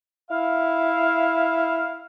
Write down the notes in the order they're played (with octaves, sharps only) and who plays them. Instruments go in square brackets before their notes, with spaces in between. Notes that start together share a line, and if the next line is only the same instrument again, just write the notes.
[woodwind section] E4 F5